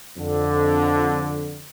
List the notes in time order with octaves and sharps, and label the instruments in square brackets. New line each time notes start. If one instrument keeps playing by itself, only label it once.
[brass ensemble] F2 D3